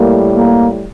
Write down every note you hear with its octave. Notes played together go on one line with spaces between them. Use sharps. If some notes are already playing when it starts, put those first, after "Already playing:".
Already playing: A2 G3 A#3
A#3